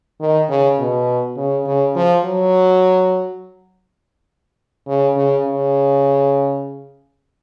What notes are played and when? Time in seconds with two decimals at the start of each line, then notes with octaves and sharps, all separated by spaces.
0.21 D#3
0.50 C#3
0.79 B2
1.37 C#3
1.66 C#3
1.96 F3
2.25 F#3
4.87 C#3
5.17 C#3
5.46 C#3